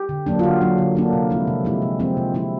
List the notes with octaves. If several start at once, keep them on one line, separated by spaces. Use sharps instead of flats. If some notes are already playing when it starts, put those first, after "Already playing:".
Already playing: G4
D3
F#3 A#3 D4
F4
D3 F#4
F#3 A#3 D4
D3
F#3 A#3 D4
C3
F3 G#3 C4 E4
C3
F3 G#3 C4 E4
C3
F3 G#3 C4 E4
C3
F3 G#3 C4 E4